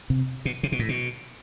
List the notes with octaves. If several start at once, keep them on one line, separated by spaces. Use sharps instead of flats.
C3
B2
C3
B2
A2
B2